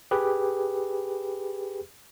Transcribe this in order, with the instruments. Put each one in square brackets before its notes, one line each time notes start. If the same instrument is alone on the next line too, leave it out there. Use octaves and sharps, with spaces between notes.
[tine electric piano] G4 G#4 B4